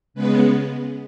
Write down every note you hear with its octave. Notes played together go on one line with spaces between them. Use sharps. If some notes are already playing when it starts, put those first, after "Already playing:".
C#3 G#3 B3 B4